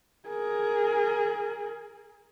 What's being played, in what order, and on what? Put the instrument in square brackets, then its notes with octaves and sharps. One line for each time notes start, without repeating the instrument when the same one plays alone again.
[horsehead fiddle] G#4 A#4